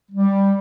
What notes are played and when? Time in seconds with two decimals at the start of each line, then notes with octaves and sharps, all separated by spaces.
0.11 G3